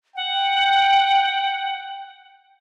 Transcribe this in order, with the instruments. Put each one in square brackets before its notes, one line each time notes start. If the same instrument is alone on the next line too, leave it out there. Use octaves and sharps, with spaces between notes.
[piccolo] F#5 [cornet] G5